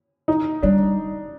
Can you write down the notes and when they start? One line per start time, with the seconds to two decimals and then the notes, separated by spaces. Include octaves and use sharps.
0.28 D#4
0.63 G3 D4